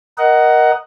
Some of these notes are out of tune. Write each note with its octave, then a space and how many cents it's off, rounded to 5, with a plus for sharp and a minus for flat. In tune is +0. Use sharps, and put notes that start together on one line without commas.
A#4 +15 D#5 +0 F#5 +15